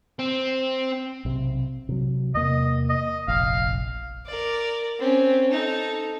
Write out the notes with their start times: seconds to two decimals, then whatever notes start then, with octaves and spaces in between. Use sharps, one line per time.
0.19 C4
1.25 B1 C3
1.89 C3 F#3
2.35 E2 C3 A#3 D#5
2.89 D#5
3.28 F1 A#1 F5
4.26 A#4 D5
4.99 C4 C#4
5.51 D#4 A4